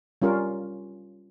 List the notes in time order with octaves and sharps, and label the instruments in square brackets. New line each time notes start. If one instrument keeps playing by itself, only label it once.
[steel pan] G3 C#4 F4 A#4